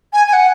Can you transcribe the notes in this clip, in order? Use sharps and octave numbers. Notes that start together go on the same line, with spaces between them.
G#5
G#5
F#5